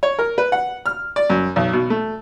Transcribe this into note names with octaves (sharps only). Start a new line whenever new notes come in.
C#5
A#4
B4
F#5
F6
D5
F#2
B1
B2
A3